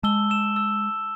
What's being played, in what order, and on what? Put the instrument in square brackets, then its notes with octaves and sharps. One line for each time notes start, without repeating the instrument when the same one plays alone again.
[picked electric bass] G#3 [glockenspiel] A5 E6 G7
[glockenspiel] E6 E7
E6